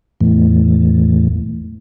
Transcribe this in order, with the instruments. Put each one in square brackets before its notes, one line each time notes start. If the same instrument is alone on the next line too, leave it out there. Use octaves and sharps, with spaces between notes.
[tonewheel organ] E2 A2